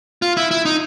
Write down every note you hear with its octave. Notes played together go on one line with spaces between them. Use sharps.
F4
E4
E4
D#4